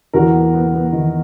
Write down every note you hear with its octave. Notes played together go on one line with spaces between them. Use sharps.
E2 F#4 A#4
B3
B3
B3
D#3